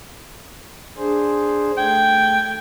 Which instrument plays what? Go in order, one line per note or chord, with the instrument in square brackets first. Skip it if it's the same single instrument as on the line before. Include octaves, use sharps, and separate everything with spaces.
[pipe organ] D4 G#4 C5
[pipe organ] A3 G#6 [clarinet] G5